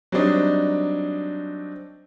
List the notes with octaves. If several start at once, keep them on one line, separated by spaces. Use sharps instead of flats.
F#3 G3 C4 D4 D#4